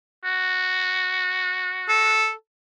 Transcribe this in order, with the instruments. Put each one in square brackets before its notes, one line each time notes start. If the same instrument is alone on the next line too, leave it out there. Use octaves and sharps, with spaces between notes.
[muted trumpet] F#4
[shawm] A4